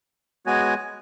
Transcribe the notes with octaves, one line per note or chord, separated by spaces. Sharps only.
G#3 B3 F#4 C#5 G#5